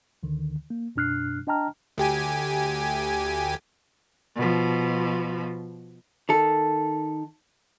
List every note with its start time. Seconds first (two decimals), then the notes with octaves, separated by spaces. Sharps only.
0.23 D2 D3 D#3
0.70 A#3
0.96 F#2 B2 D4 F6 F#6 C7
1.47 D4 D#5 G5 A5 A#5 F6
1.98 D2 G4 G#5
4.36 B2 F3
6.29 D#3 A4